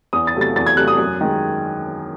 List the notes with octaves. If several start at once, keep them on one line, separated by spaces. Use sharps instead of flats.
E2 D#6
A6
C3 F#3 A3
A6
E2 A6
G#6
C3 F#3 A3 F#6
D#6
F#2
D#3 G#3